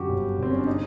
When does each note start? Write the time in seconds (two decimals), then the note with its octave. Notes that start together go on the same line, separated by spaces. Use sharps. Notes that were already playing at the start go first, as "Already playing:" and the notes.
Already playing: F#2 D3 F#4 G4
0.09 G1
0.38 G1 C4
0.50 C#4
0.59 D4
0.67 C#3 D#4